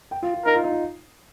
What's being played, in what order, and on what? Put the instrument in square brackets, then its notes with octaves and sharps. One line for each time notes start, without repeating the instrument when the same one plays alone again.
[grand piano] G5
F4
F4
[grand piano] D#4 [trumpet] A#4
[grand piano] F4
D#4
F4